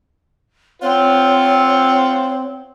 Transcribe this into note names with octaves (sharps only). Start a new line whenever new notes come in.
C4 F4 C5 C#5 F#5